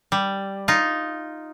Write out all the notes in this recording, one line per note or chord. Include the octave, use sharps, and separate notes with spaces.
G3
D#4 F4